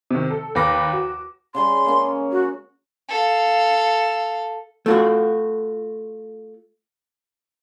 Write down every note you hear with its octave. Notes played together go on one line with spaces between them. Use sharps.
C3 D#3
A4
D#2 B4 D6 A#6
F#4
C#3 G3 G#5 C6
G#3 A#3 C#4
F#4
A4 F5
A3 F4 F#4